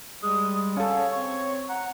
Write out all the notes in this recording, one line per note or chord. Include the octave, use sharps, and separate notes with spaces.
G3 G#3 D#6
C#4 A4 F5
C#5
C4 C#6
F#5 A#5